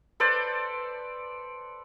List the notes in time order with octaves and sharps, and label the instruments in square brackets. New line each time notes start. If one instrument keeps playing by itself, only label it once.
[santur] A4 B4 C5 D5